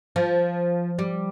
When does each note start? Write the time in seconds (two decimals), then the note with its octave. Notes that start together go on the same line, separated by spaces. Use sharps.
0.16 F3
0.99 G3